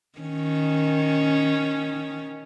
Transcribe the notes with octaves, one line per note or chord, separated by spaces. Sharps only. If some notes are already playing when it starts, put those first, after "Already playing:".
D#3 C#4